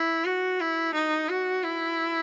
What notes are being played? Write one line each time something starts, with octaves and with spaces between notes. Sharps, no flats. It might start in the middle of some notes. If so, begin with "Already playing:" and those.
Already playing: E4
F#4
E4
D#4
F#4
E4